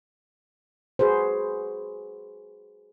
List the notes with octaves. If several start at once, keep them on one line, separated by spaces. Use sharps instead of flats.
F#4 G#4 B4 C5